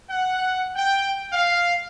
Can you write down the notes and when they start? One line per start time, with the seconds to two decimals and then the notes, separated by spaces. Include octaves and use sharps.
0.10 F#5
0.76 G5
1.33 F5